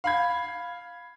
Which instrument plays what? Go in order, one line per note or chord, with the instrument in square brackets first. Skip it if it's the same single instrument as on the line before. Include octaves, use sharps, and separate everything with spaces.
[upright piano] F5 B5 G#6